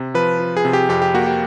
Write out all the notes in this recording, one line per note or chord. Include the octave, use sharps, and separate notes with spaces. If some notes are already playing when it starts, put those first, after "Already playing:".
Already playing: C3
F3 B4
F3
G#4
C3
G4
F2 G4
G4
A#3 F#4
G4